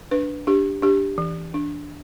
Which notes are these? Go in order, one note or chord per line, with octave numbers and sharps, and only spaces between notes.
D4 B4
D4 G4
D4 G4
E3
D4